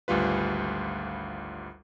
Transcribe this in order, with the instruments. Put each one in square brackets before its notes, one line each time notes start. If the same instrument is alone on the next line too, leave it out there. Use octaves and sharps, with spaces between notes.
[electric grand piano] G#1 D2 G3 F4 B4